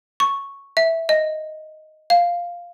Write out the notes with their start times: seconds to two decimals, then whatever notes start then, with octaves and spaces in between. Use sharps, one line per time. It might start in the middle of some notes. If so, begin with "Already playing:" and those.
0.20 C#6
0.77 E5
1.09 D#5
2.10 F5